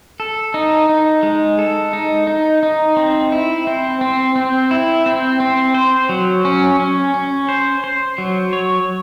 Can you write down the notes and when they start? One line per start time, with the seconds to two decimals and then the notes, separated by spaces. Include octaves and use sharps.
0.20 A4
0.54 D#4
0.89 D#4
1.23 G#3
1.59 A4
1.93 D#4
2.27 D#4
2.63 D#4
2.97 C4
3.32 E4
3.67 C4
4.01 C4
4.36 C4
4.71 E4
5.06 C4
5.40 C4
5.74 C5
6.09 F#3
6.45 C#4
6.80 C#4
7.14 C#4
7.49 C5
7.84 C5
8.18 F#3
8.53 C#5